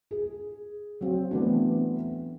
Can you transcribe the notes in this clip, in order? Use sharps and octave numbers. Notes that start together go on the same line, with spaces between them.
G#4
F#3 C4
E3 A3 B3 D4